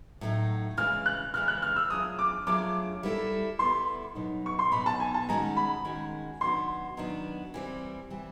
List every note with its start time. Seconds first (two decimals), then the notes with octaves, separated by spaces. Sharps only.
0.21 A2 F#3 A3 C4 D#4
0.77 C#3 E3 G#3 F6
1.06 F#6
1.34 C#3 E3 G#3 F6
1.48 F#6
1.62 F6
1.76 E6
1.90 F#3 A3 D4 F4 G#4 D#6
2.19 D6
2.47 F#3 A3 D4 F4 G#4 D6
3.03 G3 B3 E4 A4
3.59 G3 B3 E4 A4 C6
4.15 B2 F#3 B3 D#4
4.46 C#6
4.59 C6
4.72 B2 F#3 B3 D#4 B5
4.86 A5
5.00 G#5
5.14 A5
5.29 D#3 G#3 C#4 F#4 A#5
5.57 B5
5.85 D#3 G#3 C#4 F#4
6.41 D#3 F#3 B3 D4 F#4 C6
6.97 D#3 F#3 B3 D4 F#4
7.54 E3 G3 C4
8.10 E3 G3 C4